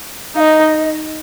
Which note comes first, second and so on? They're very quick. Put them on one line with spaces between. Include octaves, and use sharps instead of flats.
D#4 F5 D#5